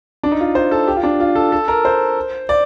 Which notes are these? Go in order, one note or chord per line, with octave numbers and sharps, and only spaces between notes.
D4
D#4
F4
C5
A4
G4
F4
D4
F4
A4
A4
A#4
C5
D5